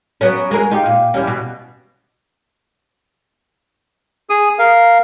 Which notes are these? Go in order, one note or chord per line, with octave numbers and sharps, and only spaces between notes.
F#3 B3 C#4
G#3 G#4 A#4
D#4 F4 G4
A#2
E2 G3 C#4
B2
G#4 D#6
A#4 F5